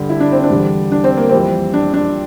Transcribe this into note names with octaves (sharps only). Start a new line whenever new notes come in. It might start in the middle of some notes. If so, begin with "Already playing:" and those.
Already playing: G2 D3 G3
E4
D4
C4
D4
E2 D3 G3
D4
C4
A#3
F2 E3 G3 C4
D4
D4